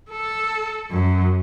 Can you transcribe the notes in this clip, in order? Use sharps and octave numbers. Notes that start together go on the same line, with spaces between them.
A4
F#2